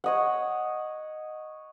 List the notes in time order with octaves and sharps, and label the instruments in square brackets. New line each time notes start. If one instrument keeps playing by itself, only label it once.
[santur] C#5 D#5 F#5